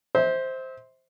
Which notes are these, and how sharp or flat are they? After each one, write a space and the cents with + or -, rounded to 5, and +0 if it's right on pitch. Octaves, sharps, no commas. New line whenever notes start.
C5 +0 E5 -35